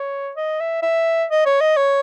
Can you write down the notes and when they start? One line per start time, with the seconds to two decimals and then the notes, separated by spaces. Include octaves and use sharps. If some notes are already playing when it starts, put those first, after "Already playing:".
Already playing: C#5
0.36 D#5
0.60 E5
0.83 E5
1.30 D#5
1.46 C#5
1.61 D#5
1.77 C#5